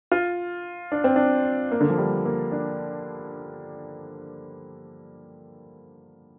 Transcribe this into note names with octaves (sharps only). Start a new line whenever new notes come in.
F4
D4
C4
D4
A#3
D3
F3
G3
A#3
D4